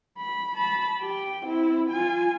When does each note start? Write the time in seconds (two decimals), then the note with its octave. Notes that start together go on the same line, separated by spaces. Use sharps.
0.18 B5
0.55 A5 B5
1.02 G4 G5
1.46 C4 E4
1.90 F4 G#5